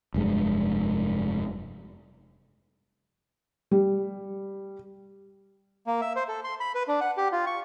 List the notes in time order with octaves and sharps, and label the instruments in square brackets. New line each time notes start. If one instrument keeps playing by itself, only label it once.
[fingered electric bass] F1 G2 G#3
[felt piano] G3
[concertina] A#3
E5
C5
A4
C6
B5
B4
D4
F#5
G4
F4
C#6